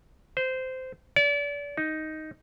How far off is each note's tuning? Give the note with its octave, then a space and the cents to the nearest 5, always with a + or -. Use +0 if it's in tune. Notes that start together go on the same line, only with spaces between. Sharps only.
C5 -15
D5 -35
D#4 +5